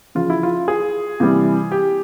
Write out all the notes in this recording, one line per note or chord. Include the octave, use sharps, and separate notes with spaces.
C#3 F3 F4
E4
F4
G#4
C3 E3 G3
G4